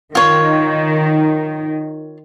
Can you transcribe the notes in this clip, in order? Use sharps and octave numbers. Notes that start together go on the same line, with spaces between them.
D#3 F4 C#5